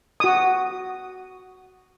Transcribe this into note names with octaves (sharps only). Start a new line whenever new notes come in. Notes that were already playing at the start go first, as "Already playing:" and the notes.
F#4 D#6